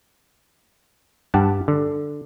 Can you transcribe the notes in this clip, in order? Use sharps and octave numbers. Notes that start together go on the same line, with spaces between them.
G2 G4 F#5 A5
D3